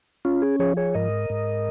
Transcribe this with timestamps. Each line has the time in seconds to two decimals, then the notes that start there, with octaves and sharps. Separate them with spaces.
0.25 C#4 F4
0.42 G#4
0.59 F3 G#4 C#5
0.77 G#4 C#5
0.94 G#2 A#4 D#5
1.30 G#2